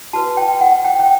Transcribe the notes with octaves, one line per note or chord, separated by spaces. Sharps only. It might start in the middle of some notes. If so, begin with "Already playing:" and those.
F#4 B4 A5
G5
F#5
G5
G5